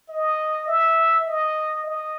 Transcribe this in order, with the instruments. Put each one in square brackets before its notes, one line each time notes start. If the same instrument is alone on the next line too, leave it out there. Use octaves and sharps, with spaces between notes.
[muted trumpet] D#5
E5
D#5
D#5